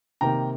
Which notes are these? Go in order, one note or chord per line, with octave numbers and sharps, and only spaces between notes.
C3 D#3 A#3 G5 A#5